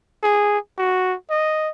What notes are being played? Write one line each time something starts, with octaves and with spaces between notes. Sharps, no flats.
G#4
F#4
D#5